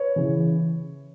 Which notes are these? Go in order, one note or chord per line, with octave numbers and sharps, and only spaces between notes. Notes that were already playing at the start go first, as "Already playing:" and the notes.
Already playing: B4 C#5
C#3 E3